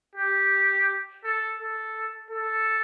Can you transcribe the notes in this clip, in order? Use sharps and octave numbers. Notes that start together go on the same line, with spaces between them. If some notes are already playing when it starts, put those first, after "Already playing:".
G4
A4
A4
A4